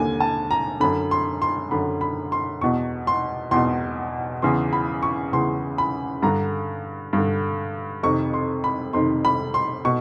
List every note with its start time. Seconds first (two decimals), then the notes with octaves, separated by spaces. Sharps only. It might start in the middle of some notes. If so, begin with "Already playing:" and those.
Already playing: D#2 D3 G#5
0.20 A5
0.51 A#5
0.80 F#2 D3 B5
1.11 C6
1.42 C6
1.71 F#2 D3 B5
2.01 B5
2.32 C6
2.61 E2 B2 C#6
3.07 C6
3.51 E2 B2 C6
4.42 E2 C#3 E3 C6
4.73 B5
5.03 C#6
5.32 E2 C#3 E3 C6
5.78 B5
6.22 G2 D3 A#5
7.13 G2 D3
8.03 F2 C3 D#3 C#6
8.34 C6
8.64 B5
8.93 F2 C3 D#3 C6
9.25 B5
9.54 C6
9.85 B2 C#6